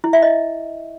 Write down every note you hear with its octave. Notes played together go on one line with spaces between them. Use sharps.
E4
E5
D#5